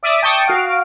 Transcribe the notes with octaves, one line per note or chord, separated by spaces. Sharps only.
D5 E5 D6 D#6
G5 A5 C#6 D#6
F#4 F5 D7